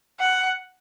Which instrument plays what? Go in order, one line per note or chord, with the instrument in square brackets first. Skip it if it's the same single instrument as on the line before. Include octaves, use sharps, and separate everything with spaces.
[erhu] F#5